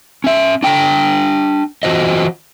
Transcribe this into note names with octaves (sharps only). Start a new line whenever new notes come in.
C#4 E5
D4 G5 G#5 A#5
E3 F3 F4 F#4 C5 D#5